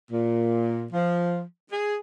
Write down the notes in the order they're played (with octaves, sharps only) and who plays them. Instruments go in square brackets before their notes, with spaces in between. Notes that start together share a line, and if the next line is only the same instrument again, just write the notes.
[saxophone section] A#2
F3
G#4